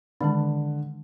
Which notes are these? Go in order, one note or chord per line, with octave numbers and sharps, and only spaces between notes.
D3 D#3 G#3 D4